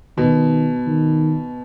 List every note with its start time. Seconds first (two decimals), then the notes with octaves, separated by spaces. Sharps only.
0.17 B2 D#3
0.87 D#3